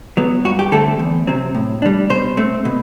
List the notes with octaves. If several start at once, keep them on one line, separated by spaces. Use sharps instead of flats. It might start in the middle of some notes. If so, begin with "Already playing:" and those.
F#3 B3
G2 F#4
G4
D3 A3 C4 A4
E2
C3 F#3 C4
A2
G3 D4
B2 C5
A3 C4
B2